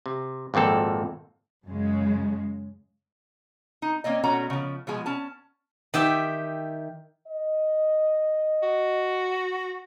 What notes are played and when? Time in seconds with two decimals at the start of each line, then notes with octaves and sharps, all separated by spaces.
0.06 C3
0.54 G#1 F2 A#2 C4 A4
1.65 F#2 C#3 G#3
3.82 D#4
4.04 A#3 C4 C#4 D#5
4.24 B2 A3 C#4 F#4 A#5
4.50 C#3 F3
4.87 B2 F3 G#3 G#5
5.06 C#4 A5
5.94 D#3 G4 E5
7.27 D#5
8.63 F#4